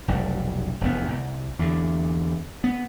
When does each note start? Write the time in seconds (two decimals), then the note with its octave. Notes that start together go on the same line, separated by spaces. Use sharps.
0.08 F1 B1 G3
0.81 F1 E2 B3
1.08 C2
1.59 E2 D3
2.64 B3